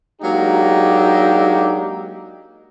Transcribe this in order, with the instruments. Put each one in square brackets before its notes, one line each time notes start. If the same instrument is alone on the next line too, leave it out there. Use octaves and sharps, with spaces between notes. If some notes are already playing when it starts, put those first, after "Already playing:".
[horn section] F#3 G#3 A#3 D4 D#4 G4